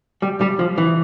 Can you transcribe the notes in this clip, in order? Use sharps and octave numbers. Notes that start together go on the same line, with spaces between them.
G3
G3
F3
E3